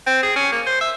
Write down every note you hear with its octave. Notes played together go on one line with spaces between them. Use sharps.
C4
G#4
C#4
A#3
C5
E5